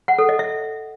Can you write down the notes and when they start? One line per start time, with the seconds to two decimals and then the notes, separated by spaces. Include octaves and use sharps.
0.08 F#5
0.19 A4
0.29 D#5
0.39 E5